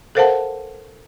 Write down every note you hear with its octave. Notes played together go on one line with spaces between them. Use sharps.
A4 A#4 C5 F5 F#5 A5